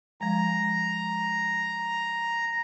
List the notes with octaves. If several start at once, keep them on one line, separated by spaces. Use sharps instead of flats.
F3 G#3 A#5